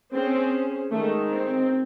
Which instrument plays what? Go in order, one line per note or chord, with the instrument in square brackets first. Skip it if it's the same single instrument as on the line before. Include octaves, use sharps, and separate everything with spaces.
[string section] C4 [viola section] C#4 G#4 C5
[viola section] D#3 G#3 D#4 [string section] A3
[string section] C4